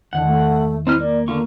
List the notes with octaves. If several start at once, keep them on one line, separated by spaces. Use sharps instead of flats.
E2 D3 D#3 F#5 A5
A3
C4 D#4 E4 F6
A#3 D5
D3 A#3 F4 C#6